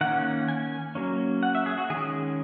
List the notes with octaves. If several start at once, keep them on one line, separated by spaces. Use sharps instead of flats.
D#3 A#3 C#4 F#5
G#5
F#3 A#3 C#4
F#5
E5
G#4
F#4
D#3 G#3 C#4 G#4